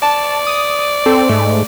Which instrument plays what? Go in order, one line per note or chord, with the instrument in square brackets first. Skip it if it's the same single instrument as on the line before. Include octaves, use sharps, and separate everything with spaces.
[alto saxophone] D5 [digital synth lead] A5
[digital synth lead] D#6
[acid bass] C4 [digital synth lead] A4
[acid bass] G#2 [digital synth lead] A3